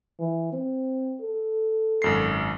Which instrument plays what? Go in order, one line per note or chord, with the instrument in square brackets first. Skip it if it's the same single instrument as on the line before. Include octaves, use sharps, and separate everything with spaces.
[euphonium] E3
C4
A4
[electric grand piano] G#1 F#2 C7